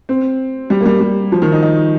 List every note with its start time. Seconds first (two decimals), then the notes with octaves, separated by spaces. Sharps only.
0.09 C4
0.70 G3
0.81 A#3
0.86 G3
1.01 G3
1.32 F3
1.42 D#3
1.52 D#4
1.63 D#4